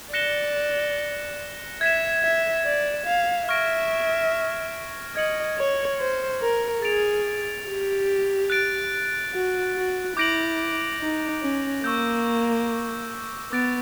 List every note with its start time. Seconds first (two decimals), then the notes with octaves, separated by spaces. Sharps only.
0.13 D5 F#6 A#6 C#7 E7 G7
1.81 E5 G#6 B6 E7
2.23 E5
2.65 D5
3.06 F5
3.48 E5 C#6 F6 A#6 D7
5.15 D#5 G#6 C#7 F#7
5.58 C#5
5.99 C5
6.41 A#4
6.82 G#4 A6 D7 F7
7.67 G4
8.50 F#6 A6 D7
9.33 F#4
9.76 F#4
10.17 E4 D6 G6 A#6 D7 F#7
11.01 D#4
11.43 C#4
11.84 A#3 C#6 E6 G6
13.52 B3 D6 F#6 A6 D7